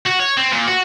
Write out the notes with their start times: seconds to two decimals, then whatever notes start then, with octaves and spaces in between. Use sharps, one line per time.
0.06 F#4
0.20 C#5
0.37 C4
0.52 A#2
0.68 F#4